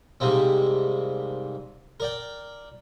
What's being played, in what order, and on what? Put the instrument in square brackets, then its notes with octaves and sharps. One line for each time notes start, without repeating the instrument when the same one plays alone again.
[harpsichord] G#2 C3 G3 A#3 C4
A#4 D5 G5